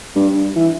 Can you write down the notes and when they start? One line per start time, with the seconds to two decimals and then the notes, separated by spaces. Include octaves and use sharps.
0.16 G2
0.56 E3